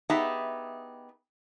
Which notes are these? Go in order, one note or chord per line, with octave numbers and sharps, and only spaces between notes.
B3 D#4 G4 G#4 E5